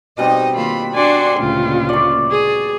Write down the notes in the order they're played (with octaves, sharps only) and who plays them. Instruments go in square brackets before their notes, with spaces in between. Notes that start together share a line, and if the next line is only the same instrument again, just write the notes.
[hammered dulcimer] B2 G3 C4 [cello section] D#4 D#5
[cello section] D#3 A#3 F4 [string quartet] B5
[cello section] D4 F#4 [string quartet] D5 G#5 C6
[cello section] D2 A#2 C#3 [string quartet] F4
[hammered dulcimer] D5 C#6
[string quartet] G#4